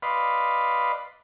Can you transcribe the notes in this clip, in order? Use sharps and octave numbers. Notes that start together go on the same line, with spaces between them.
B4 D5 D#5 F5 B5 C6